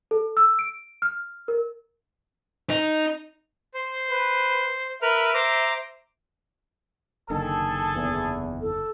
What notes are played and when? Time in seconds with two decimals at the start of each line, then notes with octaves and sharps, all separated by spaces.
0.11 A4
0.37 E6
0.59 D7
1.02 F6
1.48 A#4
2.70 D#4
3.74 C5
4.10 B4
5.02 A#4 B4 E5 F6
5.34 C5 A#5 D6
7.30 F#1 D3 D#3 G#4 A4
7.95 E2
8.61 A4